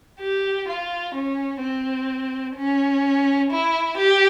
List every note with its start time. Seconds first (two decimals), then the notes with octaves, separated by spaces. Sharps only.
0.20 G4
0.68 F4
1.15 C#4
1.61 C4
2.57 C#4
3.51 E4
3.97 G4